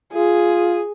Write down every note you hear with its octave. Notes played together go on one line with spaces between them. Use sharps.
F4 G#4